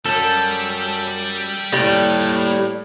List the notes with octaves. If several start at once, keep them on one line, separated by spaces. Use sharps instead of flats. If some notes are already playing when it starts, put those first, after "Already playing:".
F#2 G3 A4
A2 G3 A#3 G5